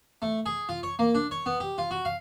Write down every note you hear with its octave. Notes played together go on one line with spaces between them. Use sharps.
A3
G#4
F4
C#5
A#3
D4
C#5
B3
G4
F4
F#4
F5